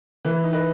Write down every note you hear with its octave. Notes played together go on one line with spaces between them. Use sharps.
E3 B4
D#4
B4 D#5